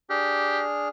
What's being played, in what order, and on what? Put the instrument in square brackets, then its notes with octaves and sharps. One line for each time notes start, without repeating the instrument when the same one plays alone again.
[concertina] D4 G#4 F6 [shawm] G4